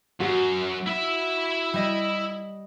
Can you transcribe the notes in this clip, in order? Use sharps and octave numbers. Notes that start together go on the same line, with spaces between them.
F#2 F#4
E4 E5
G3 D#5